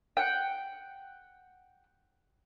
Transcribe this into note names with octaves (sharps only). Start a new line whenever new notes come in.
F#5 G5